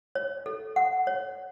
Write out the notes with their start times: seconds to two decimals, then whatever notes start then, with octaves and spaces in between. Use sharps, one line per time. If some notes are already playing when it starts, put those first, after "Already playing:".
0.15 C#5
0.46 A4
0.76 F#5
1.07 C#5